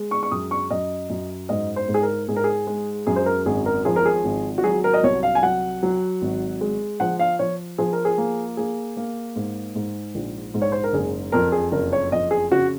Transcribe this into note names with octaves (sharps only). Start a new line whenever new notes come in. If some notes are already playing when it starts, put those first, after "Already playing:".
Already playing: G#3
C#6
C#6
F#2 D#6
C#6
F#2 D#5
F#2
G#2 D#5
C5
G#2
G#4
A#4
G#2 G#4
A#4
G#4
G#3
F#2 G#4
C5
A#4
G#1 G#4
A#4
F3 G#4
A#4
G#4
G#1
F#4
F#3 G#4
A#4
D#5
C2 C#5
F5
G#5
F#3 F#5
F#3
G#1
G#3
F3 F#5
F5
F3 C#5
F3 G#4
A#4
G#4
A#3
A#3 G#4
A#3
G#2
G#2
A#1
G#2
C#5
C5
A#4
F#1 G#4
F2 A#4
G#4
F#1 A#4
C#5
F2 D#5
G#4
C#3 F#4